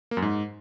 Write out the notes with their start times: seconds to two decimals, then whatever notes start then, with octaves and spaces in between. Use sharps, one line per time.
0.11 A#3
0.17 F#2
0.22 G#2